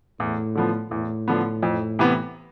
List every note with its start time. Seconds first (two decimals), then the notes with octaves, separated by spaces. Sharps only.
0.20 E2 A2
0.55 D3 F3 B3
0.91 E2 A2
1.28 D3 F3 B3
1.62 F2
1.99 C3 E3 B3